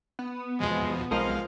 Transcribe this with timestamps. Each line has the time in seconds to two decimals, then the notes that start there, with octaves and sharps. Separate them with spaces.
0.19 B3
0.60 E2 B2 F3 G#3
1.11 B1 F3 G#3 C4 A#4 D#5 F5